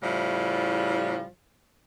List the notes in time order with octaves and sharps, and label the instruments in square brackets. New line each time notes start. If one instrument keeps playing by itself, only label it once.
[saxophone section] A2 C#3 F3 G3 E4